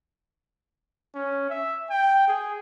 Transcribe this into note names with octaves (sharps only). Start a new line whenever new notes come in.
C#4
E5
G5
G#4